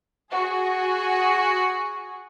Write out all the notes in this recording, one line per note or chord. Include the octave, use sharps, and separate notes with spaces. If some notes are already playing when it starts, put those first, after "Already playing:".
F#4 G#4